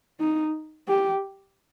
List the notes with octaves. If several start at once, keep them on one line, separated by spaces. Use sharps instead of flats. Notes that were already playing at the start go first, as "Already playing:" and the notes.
D#4
G4